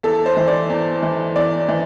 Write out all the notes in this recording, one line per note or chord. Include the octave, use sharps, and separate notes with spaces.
E2 A4
C5
E3
D5
E2
E3
E2 D5
E3